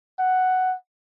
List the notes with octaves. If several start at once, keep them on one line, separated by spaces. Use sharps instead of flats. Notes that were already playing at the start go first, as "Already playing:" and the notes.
F#5